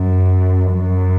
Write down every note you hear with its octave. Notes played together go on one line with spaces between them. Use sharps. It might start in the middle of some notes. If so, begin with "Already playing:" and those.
Already playing: F#2
F#2